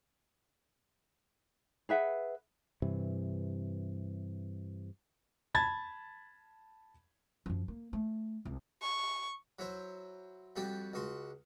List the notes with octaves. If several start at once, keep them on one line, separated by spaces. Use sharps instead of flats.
G#4 B4 E5 F#5
G2 C3 E3
A5 B5 G#6 A6
F#2 F3
A#3
A3
C2
C#6
F#3 E4 C5
F2 G3 F#4 G4 G5
C#2 F#4 C6